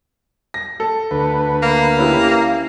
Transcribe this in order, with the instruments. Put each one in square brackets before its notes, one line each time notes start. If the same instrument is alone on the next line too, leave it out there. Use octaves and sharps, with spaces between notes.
[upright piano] A#6
A4
[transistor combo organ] D2 B4
[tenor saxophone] A#3
[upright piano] C#4 E4 G4